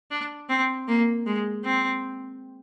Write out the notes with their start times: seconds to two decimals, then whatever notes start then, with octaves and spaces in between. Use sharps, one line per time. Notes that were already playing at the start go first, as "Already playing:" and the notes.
0.11 D4
0.49 C4
0.88 A#3
1.26 G#3
1.64 C4